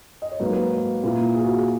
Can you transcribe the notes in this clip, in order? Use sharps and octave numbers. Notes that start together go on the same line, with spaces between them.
D#5
C#5
G#2 F#3 A#3 B4
A#4
B4
A#2 A#3 E4
G#4
F#4
G#4